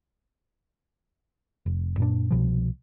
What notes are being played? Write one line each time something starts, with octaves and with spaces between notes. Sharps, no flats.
F1
F#2 A#2 D4
C2 B2 F3